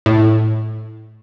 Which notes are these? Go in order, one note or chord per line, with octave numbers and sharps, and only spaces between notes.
A2